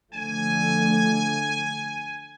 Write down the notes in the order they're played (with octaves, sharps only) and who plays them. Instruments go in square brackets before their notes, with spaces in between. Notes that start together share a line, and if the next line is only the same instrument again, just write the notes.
[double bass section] D3 F3 A3 [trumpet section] G#5